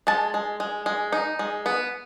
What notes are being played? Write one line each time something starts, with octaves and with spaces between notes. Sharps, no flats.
G#3 A5
G#3
G#3
G#3
D#4
G#3
B3